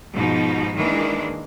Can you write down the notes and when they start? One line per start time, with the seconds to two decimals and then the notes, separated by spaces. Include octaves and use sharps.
0.13 G#2 B2 F3 D#4
0.75 D#3 E3 G#3 A#3 D4